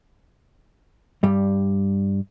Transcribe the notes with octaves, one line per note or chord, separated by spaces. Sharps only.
G2 G3